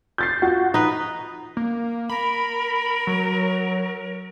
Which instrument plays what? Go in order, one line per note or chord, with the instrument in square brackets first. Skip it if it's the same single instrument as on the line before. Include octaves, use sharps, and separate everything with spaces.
[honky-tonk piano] G6 A6 C7
F4 F#4
[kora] D#4 B4
[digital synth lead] A#3
[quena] A#4 [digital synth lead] B5
[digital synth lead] F#3